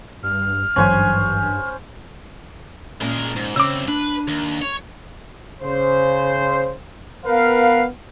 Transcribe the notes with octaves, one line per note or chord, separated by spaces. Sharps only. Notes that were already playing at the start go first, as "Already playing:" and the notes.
G2 F6
G#1 G2 E3 F#3 C#4 C5 G#5
A#2 G#3 C#4 A#4 A5
G#2
D2 C#3 C4 D6 E6
D4 B4
D#2
C#5
C#3 C5
B3 A#4 B4 F5